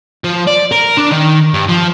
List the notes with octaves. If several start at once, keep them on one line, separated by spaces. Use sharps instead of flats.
F3
D5
A#4
D4
D#3
G2
F3